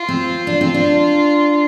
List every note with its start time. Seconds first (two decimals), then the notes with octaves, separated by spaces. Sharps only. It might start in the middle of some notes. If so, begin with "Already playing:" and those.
Already playing: F4
0.08 C4
0.47 D4
0.61 C4
0.74 D4